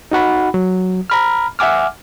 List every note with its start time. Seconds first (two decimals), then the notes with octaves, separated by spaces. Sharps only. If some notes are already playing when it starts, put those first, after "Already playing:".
0.12 D#4 F#4 F#5 B5
0.54 F#3
1.10 A#5 B5 F6
1.59 E5 F#5 G#5 D6 F6